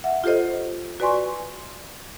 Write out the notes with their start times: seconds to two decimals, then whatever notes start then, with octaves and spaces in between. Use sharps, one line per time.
0.04 E5 F#5
0.24 F4 G4 A4 C5 D#5
1.00 F#4 B4 D5 G#5 C6 C#6